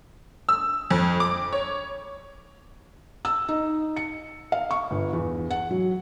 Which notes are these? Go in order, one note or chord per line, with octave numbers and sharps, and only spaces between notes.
E6
F2
D6
C#5
E6
D#4
C#7
F5
C#6
G1
E2
F#5
F#3